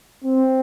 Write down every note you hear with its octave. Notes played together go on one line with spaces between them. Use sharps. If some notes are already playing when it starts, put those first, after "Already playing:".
C4